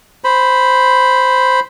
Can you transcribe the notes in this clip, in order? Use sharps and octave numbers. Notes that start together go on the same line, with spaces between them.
C5 B5